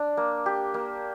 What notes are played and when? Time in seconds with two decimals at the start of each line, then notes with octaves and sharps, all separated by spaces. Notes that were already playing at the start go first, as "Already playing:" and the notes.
Already playing: D4
0.17 A#3
0.46 G4
0.74 A#3